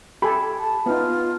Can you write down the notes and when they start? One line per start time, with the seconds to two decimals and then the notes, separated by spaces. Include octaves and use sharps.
0.22 G4 A4 G#5 B5
0.58 A5
0.86 B3 D#4 F4